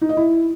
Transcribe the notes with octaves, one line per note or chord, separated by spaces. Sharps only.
D#4
D#5
E4